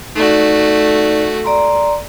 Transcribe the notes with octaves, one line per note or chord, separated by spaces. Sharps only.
A3 D#4 F#4 D5
D5 A#5 C6